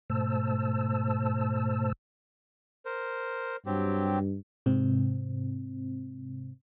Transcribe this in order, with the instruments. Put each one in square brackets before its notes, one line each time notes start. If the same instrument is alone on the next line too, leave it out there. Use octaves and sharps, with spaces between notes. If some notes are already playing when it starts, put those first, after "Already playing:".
[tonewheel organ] G#2 B2 A3 C5 A5 E6
[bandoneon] A#4 C5
[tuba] G2 [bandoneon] F#3 C4 G4
[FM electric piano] G#2 C3 C4